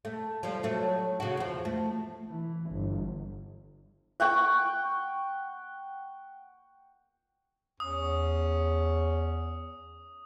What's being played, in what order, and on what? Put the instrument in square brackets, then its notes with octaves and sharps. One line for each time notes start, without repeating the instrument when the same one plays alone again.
[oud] A3
F3 G3
F#3 A3
C#3 F#4
E2 F3
A3
[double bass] E3
G1
[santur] F#5 G5 C#6
[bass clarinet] E2 [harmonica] C#4 [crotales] D#6